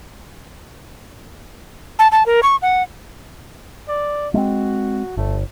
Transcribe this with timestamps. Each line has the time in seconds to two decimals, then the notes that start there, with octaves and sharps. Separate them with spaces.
1.99 A5
2.12 A5
2.26 A#4
2.43 C#6
2.62 F#5
3.88 D5
4.34 G#3 A3 C4 F#4
5.17 G1 A3